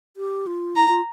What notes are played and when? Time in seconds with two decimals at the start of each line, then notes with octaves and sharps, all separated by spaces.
0.17 G4
0.47 F4
0.76 E4 A#5
0.88 F4